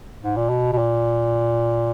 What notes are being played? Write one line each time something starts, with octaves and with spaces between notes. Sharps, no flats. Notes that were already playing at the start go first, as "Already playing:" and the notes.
G#2
A#2
B2
B2
A#2